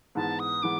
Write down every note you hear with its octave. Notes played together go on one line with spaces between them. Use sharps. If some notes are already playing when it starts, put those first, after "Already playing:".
G#2 E3 G#3 B3 A5
D#6
E3 G#3 B3 D6